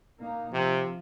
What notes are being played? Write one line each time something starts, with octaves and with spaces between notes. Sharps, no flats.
A#3 D#4
C3 F3